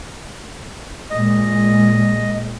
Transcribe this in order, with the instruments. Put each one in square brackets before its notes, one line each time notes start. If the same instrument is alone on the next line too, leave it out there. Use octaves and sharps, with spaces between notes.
[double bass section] A#2 G#3 [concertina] D#5